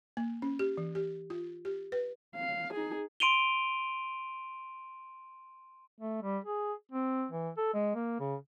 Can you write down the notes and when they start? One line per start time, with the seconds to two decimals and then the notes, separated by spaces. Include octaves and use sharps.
0.17 A#3
0.42 C#4
0.59 G4
0.77 E3
0.95 G4
1.30 F4
1.65 G4
1.92 B4
2.35 F5
2.73 D#4 G#4
3.20 C6 D7 D#7 F7 G7
6.00 A3
6.22 G3
6.45 G#4
6.92 C4
7.31 E3
7.57 A4
7.74 G#3
7.95 A#3
8.20 C#3